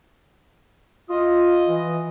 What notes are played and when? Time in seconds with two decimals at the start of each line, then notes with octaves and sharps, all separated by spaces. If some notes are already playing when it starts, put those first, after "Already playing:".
1.09 F4 D#5
1.68 E3